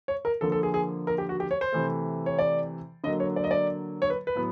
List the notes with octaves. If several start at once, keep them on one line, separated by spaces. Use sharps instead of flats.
C#5
A#4
D3 F3 A#3 A4
A4
G#4
G#4
A#4
G4
F#4
G4
C#5
C5
C3 E3 A3
C#5
D5
D3 F#3 A#3 D#5
C#5
D5
D#5
D5
C#5
B4
B4
A2 F#3 B3